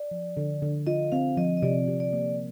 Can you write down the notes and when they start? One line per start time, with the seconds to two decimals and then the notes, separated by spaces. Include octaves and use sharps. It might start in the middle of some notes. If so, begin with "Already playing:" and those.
Already playing: D5
0.11 F3
0.37 D3
0.62 D3
0.87 F4 D#5
1.12 C4 F5
1.37 F3 D#5
1.57 D#5
1.62 C3 D5
1.88 C3
2.00 D5
2.13 A#3